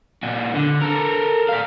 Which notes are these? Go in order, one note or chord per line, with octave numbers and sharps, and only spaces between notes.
A#2 F#4
D3
A4 A#4
D5 F5